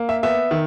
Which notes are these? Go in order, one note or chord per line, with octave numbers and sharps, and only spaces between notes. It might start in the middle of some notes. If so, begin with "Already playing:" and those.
Already playing: A#3
E5
B3 E5
D#3